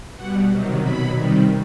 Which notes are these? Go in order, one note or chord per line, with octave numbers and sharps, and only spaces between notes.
B2 G3 F#5
C3 D#3 F#3
B2 F#3 B5
C3 D#3 G3